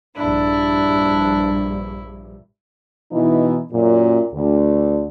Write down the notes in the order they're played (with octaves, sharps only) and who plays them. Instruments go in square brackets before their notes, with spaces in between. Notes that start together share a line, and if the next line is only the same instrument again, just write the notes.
[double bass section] A#1 G2 [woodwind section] D4 [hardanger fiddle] E4
[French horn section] B2 E3 D#4 E4
F#2 A#2
D2